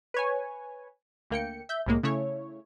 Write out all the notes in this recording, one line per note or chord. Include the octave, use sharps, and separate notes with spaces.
B4 C#5 G#5
D2 A#3 G5 C#7
E5 G6
C2 A2 G#3 A#3
C#3 A3 E4 C#5